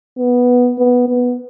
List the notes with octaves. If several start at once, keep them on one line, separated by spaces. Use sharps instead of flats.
B3
B3
B3